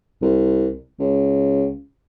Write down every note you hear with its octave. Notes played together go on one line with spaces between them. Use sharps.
C2
C#2